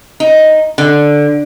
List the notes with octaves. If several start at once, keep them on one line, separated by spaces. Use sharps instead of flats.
D#4
D3